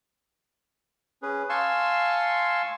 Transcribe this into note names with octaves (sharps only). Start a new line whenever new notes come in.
C#4 G#4 B4
F5 G#5 A5 C6 C#6 E6